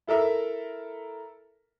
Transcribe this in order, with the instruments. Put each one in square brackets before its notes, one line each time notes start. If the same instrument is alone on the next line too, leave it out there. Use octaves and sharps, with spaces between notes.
[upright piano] E4 A4 A#4 E5